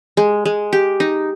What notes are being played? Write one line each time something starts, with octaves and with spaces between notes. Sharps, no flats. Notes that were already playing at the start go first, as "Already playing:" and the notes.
G#3
G#3
G4
D#4